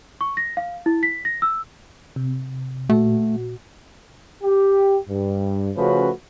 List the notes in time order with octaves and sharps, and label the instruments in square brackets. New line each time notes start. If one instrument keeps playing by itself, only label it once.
[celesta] C#6
A#6
F5
E4
B6
A#6
E6
[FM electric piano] C3
[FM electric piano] A#2 F#4 [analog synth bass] A3
[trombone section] G4
G2
C#3 F3 A3 C#4 F#4 B4